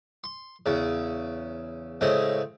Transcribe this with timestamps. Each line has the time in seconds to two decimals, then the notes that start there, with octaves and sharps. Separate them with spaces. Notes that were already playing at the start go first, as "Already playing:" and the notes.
0.24 C6
0.66 E2 C#3
2.01 A2 C#3 G#3 C4